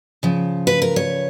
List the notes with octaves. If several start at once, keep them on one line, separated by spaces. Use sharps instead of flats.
C#3 F3
B4
A#4
C#5